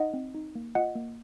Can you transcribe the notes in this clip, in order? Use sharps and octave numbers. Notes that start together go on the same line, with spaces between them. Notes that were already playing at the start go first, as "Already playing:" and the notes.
Already playing: D#4 D#5 F#5
C4
D#4
A#3
F4 D#5 F#5
A#3